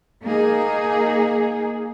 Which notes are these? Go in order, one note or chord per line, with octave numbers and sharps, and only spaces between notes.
A#3 D#4 G#4